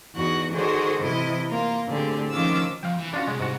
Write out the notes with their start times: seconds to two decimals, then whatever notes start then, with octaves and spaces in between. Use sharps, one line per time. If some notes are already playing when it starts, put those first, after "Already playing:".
0.14 E2 D#4 F#4 F#6
0.53 D#3 F#4 G#4 A4 C5 D5
1.01 C3 E3 E4 D#5 D#6
1.49 A#3 F4 A#4
1.86 A2 D3 C4 G4 G#4
2.30 D#3 F3 C#4 F4 D6 E6
2.83 F2 F5 G5
2.98 E3
3.14 C#4 D4 F4 F#4 C#5
3.28 C3 G3 G#3
3.40 G#2 F#4